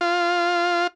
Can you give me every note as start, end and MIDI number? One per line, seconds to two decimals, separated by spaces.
0.01 0.87 65